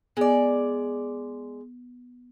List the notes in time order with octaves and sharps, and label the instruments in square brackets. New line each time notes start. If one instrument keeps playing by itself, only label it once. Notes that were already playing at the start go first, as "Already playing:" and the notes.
[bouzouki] G#3 D5 [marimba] B3